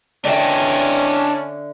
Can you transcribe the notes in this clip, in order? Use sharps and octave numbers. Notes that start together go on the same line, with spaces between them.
D3 C#4 D4 D#5 E5 G5